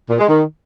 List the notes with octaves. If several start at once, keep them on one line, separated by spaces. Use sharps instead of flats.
A#2
G#3
D#3